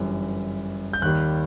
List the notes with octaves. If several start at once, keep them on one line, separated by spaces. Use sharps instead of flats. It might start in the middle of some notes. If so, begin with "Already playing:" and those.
Already playing: G1 F#2 E3 G3
G6
D#2 D#3 G3 F#6